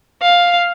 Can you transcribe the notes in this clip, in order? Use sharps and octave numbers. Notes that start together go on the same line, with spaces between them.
F5